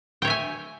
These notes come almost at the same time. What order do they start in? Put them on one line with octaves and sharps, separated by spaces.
G5 C#5 E5 G#5